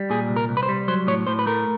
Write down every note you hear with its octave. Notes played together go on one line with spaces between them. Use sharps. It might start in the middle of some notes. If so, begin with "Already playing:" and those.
Already playing: G3
A#2 G#4
C2
A#4
C2
B4
C5
G3
F#3 C5
A2 C#5
A2 C5
B4
A3 A#4